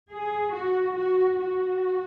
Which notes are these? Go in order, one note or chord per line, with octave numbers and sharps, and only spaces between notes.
G#4
F#4
F#4
F#4